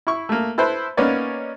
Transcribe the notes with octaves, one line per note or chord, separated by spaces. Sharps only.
E4 C#6
A3 A#3
E4 A4 B4 C5
A#3 B3 C#4 D#4 D5